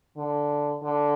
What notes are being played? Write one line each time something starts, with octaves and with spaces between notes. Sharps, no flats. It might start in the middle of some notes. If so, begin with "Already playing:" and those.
D3
D3